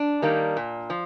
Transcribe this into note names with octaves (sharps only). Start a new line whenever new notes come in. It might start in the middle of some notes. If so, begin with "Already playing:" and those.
Already playing: D4
D#3 G3 A#3
A#2
F3